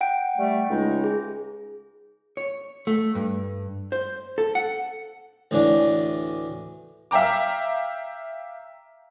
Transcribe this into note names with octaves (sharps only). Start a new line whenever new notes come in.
F#5 G5 D7
G3 A3
C#2 G#3 D#4
G#4
C#5
A3
G2
C5
A4
F#5
D2 A2 E3 D4
E5 F5 G5 A#5 D6